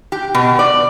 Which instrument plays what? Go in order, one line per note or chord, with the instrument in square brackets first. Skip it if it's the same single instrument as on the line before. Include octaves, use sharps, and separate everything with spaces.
[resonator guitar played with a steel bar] G4
B2
D5